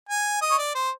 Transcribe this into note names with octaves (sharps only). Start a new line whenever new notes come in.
G#5
D#5
C#5
D5
C5